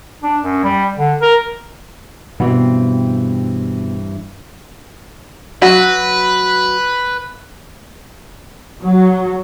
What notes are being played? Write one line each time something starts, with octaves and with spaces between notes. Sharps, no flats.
D4
F#2
G3
D3
A#4
G2 B2 E3 C4
F#3 F#4 B4
F#3